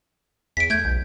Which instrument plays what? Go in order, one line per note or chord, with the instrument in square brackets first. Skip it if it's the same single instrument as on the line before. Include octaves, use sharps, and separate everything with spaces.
[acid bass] E2 [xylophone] B6 D7
[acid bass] A3 [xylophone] G6 G#6 D7
[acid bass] B1